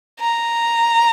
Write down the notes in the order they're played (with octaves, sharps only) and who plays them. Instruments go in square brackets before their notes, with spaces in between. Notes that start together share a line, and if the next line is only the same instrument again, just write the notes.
[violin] A#5